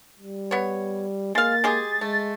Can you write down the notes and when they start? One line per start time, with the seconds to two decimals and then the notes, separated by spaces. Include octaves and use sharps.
0.19 G3
0.51 B3 C#5
1.35 G#3 A#3 F5 A6
1.64 G#3 G4 G#4
2.01 G#3 A3